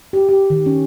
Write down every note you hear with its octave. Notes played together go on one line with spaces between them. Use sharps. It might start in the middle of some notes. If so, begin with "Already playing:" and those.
G4
G4
D#3
C#4